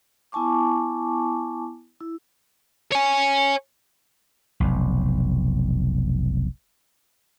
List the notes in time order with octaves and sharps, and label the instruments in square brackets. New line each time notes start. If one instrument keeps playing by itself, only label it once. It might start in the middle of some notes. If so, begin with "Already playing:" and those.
[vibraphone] B3 E4 G#5 A5 C#6 D6
E4
[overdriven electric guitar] C#5 G#5
[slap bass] F1 B1